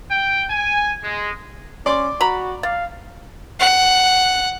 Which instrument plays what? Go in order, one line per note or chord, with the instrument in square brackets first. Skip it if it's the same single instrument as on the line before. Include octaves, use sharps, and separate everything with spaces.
[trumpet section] G5
G#5
G#3
[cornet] C#4 [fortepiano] D5 C6 D6
[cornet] F#4 [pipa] A#5 B5
[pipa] D5 [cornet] F5
[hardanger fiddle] F#5